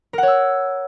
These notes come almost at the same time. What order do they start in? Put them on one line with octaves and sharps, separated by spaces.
A#4 F#5 C#5 E6